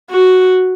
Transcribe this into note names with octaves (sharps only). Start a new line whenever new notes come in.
F#4